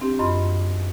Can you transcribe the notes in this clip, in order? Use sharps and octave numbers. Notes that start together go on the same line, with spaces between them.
C4 D4 G4
F#2 F4 D#5 B5 C6